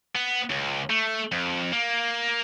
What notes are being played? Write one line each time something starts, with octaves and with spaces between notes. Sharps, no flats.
B3
C#2
A3
F2
A#3